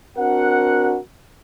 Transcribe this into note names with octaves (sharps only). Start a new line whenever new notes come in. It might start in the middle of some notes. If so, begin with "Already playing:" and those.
C4 D4 F#4 A#4 F#5